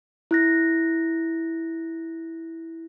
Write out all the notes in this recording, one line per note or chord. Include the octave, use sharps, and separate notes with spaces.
E4 F#6 A#6